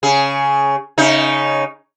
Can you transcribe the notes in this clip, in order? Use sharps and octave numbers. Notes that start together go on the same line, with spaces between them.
C#3 G#4
C#3 D#4